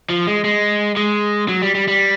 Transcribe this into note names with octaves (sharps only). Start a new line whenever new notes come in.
F3
G#3
G#3
G#3
F#3
G3
G3
G3